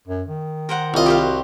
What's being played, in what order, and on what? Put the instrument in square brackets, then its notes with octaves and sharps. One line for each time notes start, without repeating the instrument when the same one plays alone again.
[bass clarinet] F#2
D#3
[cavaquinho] A#4 C5 F#5
[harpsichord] C2 D#5 [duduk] F4
[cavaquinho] G4 C5 F5
[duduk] F#4